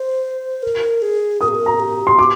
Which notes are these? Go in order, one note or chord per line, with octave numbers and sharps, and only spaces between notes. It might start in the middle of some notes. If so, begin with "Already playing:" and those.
Already playing: C5
A#4
G#4
A#4 D#6
G#4
A#4
A#5
G4
C6
G4 D6